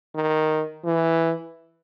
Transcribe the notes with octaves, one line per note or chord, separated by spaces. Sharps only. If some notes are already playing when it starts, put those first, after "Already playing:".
D#3
E3